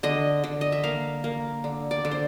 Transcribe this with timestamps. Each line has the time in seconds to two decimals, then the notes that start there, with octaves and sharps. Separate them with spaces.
0.03 D3 D#5
0.44 D3
0.61 D#5
0.72 E5
0.84 A#3 F5
1.24 A#3
1.64 D3
1.91 D5
2.05 D3
2.11 C5